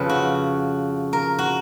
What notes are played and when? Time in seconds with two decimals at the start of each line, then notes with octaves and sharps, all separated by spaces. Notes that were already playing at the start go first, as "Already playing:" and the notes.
Already playing: F2 C#3 B4
0.10 F#4
1.13 A#4
1.39 F#4